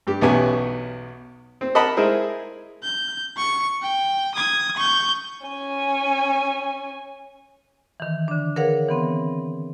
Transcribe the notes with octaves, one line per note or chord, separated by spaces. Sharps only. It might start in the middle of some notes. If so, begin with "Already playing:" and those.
G2 G4
B1 E2 B3 C#4 G4 G#5
C4
A#4 D#5 F#5 A5 B5
G#3 E4 G#4 A#4 C5
G6
C#6 C#7
G5
D#6 G#6
C#6 G6
C#4 G#5
D#3 E3
D3 D4
G#4 A#4 B4 C#5 F5 F#5
E3 B3 C4